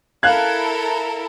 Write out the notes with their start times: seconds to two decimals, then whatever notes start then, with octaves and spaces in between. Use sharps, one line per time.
0.23 E4 A4 A#4 F5 F#6 G#6